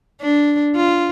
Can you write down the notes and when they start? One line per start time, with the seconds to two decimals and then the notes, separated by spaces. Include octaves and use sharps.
0.21 D4
0.76 F4